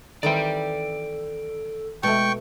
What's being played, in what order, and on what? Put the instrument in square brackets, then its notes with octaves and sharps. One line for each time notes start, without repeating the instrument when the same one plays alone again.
[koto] D#3 E3 C4 [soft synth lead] A4 [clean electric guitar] D5 G5
[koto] B2 A3 [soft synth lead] G#3 [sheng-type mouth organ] G5 C#6